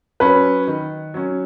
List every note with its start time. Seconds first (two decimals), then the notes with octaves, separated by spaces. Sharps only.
0.20 F#3 C#4 B4
0.67 D#3
1.14 F#3 C#4